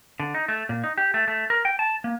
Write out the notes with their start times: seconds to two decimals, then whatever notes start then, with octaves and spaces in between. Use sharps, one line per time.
0.20 D3
0.35 D#4
0.48 A3
0.69 A#2
0.84 D#4
0.98 G4
1.14 A3
1.28 A3
1.50 A#4
1.65 G5
1.79 A5
2.04 A#3